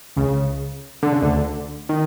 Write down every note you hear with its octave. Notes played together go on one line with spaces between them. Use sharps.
C#2 C#3
D3
C#3
D2 D3
D#3